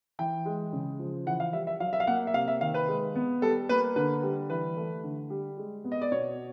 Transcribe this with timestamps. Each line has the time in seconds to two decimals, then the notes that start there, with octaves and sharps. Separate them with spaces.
0.19 E3 G5
0.45 G#3
0.73 C#3
0.99 F3
1.26 E3 F#5
1.40 F5
1.53 G3 E5
1.67 E5
1.80 F#3 F5
1.93 E5
2.00 F5
2.07 A#3 F#5
2.27 E5
2.34 C3 F5
2.48 E5
2.61 D#3 F5
2.74 B4
2.88 G#3
3.15 B3
3.42 G3 A4
3.69 A#3 B4
3.96 D3 B4
4.23 G3
4.50 E3 B4
4.77 A3
5.04 D3
5.30 G3
5.58 G#3
5.84 B3
5.92 D#5
6.02 D5
6.12 B2 C#5